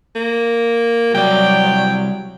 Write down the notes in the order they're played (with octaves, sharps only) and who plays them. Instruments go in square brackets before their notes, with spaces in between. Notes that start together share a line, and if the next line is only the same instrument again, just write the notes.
[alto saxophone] A#3
[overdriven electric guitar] C2 D5 [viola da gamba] F#3 [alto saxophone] G5